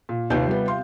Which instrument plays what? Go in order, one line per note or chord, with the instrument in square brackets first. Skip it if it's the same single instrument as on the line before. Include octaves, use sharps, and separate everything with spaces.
[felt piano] A#2
[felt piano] D#2 B4 G6 [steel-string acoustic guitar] C3 F4
[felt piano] G3 B3
F5 C6